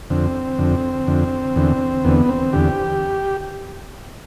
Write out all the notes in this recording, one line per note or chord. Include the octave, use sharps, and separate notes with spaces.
F2 D3 C4
F2 D3
F2 D3
E2 D3
E2 D3 B3
C4
E2 D3 G4